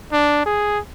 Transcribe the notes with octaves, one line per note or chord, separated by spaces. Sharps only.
D4
G#4